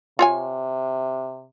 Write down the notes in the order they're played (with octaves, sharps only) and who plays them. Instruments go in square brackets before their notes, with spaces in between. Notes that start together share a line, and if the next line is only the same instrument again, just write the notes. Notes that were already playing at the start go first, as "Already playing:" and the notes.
[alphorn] C3 [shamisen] F4 C#5 G#5